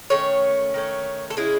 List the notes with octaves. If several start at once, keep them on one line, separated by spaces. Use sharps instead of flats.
D#3 A3 C#4 A4 C#5
D#3 A3 C#4
A4
C#3 G#3 C#4 E4 G#4